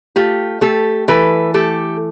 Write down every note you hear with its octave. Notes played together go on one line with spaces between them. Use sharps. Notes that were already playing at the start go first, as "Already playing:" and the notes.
A3 F4 G4
A3 G4 A4
E3 A4 B4
A3 G4 A4